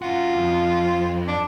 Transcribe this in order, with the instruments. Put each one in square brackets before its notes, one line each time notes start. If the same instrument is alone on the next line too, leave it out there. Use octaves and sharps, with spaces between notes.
[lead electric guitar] C#4 F#4 [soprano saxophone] F4
[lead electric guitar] F2
[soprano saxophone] D4